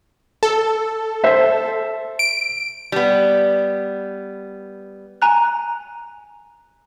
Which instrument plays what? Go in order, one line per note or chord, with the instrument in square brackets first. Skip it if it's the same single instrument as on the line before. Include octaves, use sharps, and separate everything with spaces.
[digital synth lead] A4
[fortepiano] C5 E5
[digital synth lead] D7
[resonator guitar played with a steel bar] G3 B3
[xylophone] G#5 A#5 F#6